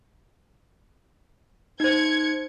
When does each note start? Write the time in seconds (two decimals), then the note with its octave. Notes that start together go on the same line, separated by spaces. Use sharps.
1.80 D#4 C5 G#6 C#7